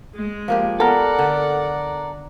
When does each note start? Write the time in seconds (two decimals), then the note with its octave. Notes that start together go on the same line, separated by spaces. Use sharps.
0.15 G#3
0.48 F3 A#3 G4
0.80 B3 A4 A#4 D5 F#5
1.19 D3